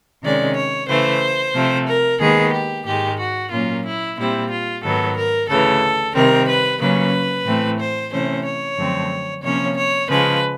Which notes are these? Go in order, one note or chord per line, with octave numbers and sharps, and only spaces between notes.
C3 D#3 G#3 C#4 D5
C#5
C#3 E3 A3 C5
C3 F3 A3
A#4
D#2 D#3 G#3 B3 G#4
G4
G#2 D#3 G#3 G4
F#4
A#2 F#3 A#3 C#4 F4
E4
A#2 G3 C4 E4
F4
G#2 D#3 F#3 B3 A4
A#4
D2 C#3 E3 A4
C3 D#3 G3 C4 A#4
B4
C#3 F#3 A#3 C#4 B4
A2 E3 A3 C4
C5
C3 E3 A3 C#4 C5
C#5
F#2 D3 F3 A3 C4
C3 F3 A#3 C#4 C#5
C#5
C#3 F3 G#3 B4